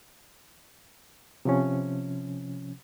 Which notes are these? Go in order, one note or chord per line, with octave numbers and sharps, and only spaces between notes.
C3 F3 C#4